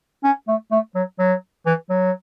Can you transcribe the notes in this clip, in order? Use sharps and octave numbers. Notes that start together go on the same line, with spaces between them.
C#4
A3
A3
F#3
F#3
E3
F#3